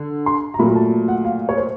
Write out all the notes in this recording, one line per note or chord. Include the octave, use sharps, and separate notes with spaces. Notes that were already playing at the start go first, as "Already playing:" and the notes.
Already playing: D3
C6
A#5
A#2 F#3 A3 B5
A5
F#5
F5
C#5
C5